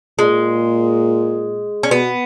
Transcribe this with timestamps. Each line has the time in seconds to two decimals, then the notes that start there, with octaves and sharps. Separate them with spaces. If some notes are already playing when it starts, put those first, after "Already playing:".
0.19 A#2 G#3
1.83 C#4
1.91 B2 B3